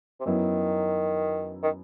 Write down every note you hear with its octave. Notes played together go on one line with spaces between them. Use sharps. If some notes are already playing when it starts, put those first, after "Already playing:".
C3
F#2 D#3 F#3 B3 E4
D#3